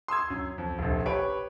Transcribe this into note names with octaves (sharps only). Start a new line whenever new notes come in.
C6 D#6 E6 G#6
F#2
F2
F1 A#1
G4 B4 C#5 D7